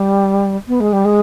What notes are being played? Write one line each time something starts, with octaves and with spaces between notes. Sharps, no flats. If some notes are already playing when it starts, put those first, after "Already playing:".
Already playing: G3
B3
G#3
G3
G#3